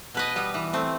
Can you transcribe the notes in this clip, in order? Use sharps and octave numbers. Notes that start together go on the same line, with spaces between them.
B2 B4 D#5
G3 B3
E3
A3 C4